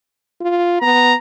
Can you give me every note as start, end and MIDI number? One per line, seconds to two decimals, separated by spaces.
0.41 0.78 65
0.82 1.13 59
0.82 1.18 82